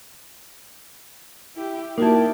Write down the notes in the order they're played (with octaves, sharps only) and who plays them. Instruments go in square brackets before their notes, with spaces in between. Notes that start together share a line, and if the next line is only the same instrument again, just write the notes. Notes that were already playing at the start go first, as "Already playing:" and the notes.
[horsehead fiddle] E4 G4
[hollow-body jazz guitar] A#3 E4 [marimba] D#4 F#4 A5 [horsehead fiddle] G4 D5